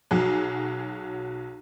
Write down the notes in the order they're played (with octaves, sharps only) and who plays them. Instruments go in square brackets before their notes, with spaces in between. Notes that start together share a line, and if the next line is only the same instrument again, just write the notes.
[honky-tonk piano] B1 F#3 G#4